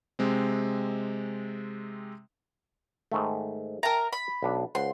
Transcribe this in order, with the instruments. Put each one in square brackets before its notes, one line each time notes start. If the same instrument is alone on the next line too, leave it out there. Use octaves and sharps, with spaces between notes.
[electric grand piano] C3 G#3 C4
[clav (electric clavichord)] G#2 D#3 A3
[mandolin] A#4 A#5 [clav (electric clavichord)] E5 G5 A5
[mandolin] B5
[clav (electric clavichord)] B1 D4
[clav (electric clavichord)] C#2 C5 F#5 [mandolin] C6